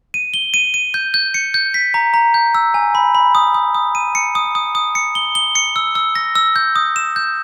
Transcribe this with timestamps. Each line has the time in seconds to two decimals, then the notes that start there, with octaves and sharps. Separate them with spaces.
0.14 D#7
0.34 G7
0.54 D#7
0.74 D#7
0.94 G6
1.14 G6
1.34 C#7
1.54 G6
1.74 B6
1.94 A#5
2.14 A#5
2.34 G6
2.55 E6
2.74 G#5
2.95 B5
3.15 B5
3.35 D#6
3.54 D#6
3.75 D#6
3.95 D#7
4.15 C#7
4.35 D#6
4.55 D#6
4.75 D#6
4.95 C#7
5.15 G7
5.35 G7
5.55 C#7
5.76 E6
5.95 E6
6.15 A#6
6.35 E6
6.56 G6
6.76 D#6
6.96 E7
7.16 G6